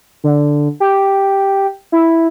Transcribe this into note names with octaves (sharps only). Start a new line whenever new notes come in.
D3
G4
E4